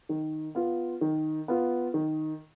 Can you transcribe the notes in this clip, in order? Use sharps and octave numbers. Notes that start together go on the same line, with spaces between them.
D#3
B3 F4
D#3
B3 F4
D#3